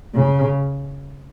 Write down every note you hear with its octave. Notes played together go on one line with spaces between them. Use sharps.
C#3